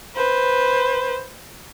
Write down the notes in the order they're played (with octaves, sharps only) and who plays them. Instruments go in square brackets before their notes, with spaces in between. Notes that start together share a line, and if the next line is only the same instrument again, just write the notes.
[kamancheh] B4 C5